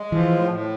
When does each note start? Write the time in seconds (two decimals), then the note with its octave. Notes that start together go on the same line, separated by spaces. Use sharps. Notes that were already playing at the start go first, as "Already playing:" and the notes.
Already playing: G#3
0.12 E3 F3
0.31 A2
0.50 A2